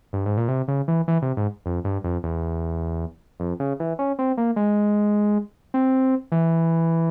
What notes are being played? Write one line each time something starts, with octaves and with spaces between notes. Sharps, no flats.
G2
G#2
A#2
C3
C#3
E3
E3
C3
G#2
F2
G2
F2
E2
F2
C#3
E3
C#4
C4
A#3
G#3
C4
E3